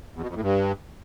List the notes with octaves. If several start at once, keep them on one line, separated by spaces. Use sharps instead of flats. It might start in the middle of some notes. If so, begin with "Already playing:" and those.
E2
B2
F2
A2
G2